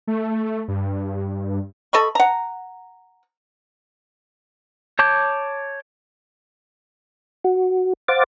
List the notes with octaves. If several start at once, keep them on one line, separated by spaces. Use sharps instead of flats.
A3
G2
A4 D#5 B5 C#6
F#5 A#5
C#5 A5 D6 G6
F#4
C5 F5 F#5 D6 A6